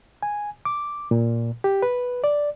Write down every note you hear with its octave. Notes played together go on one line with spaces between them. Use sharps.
G#5
D6
A#2
G4
B4
D5